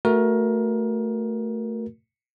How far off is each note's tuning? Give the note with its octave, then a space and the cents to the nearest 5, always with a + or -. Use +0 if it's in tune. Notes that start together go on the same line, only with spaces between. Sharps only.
A3 +15 F#4 +0 A#4 +20